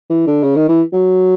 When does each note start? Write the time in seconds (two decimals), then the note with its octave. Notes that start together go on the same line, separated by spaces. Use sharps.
0.10 E3
0.26 D3
0.43 C#3
0.56 D#3
0.68 E3
0.93 F#3